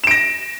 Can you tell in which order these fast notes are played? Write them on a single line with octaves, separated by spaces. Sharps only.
E7 D7 A#6